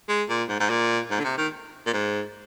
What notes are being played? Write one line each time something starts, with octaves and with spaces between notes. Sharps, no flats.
G#3
A#2
G#2
G#2
A#2
G#2
D3
C3
D#3
A#2
G#2